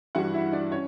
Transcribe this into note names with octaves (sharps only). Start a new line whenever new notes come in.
G2 E3 G3 F#4 F#5
E4 E5
D4 D5
C#4 C#5